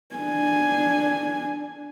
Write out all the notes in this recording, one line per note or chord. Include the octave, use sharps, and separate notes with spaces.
D4 G#5